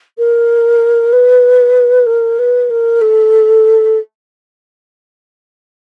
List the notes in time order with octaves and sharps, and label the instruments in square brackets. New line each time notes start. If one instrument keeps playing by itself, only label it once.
[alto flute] A#4
B4
A#4
B4
A#4
A4